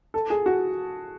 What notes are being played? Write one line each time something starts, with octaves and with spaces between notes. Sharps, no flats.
A4
G#4
F#4